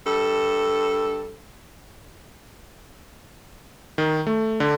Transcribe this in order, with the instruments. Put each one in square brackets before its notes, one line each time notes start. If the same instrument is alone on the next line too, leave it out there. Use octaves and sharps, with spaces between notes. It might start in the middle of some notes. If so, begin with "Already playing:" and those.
[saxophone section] G2 A4
[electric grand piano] D#3
A3
D3